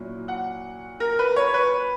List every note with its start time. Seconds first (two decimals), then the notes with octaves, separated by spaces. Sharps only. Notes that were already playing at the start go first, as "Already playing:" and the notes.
Already playing: A#2 F#3 C#4 E4
0.28 F#5
1.00 A#4
1.19 B4
1.36 C#5
1.54 B4